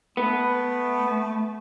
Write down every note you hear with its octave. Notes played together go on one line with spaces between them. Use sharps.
A3 B3